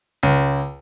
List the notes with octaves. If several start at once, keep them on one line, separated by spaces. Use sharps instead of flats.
C#2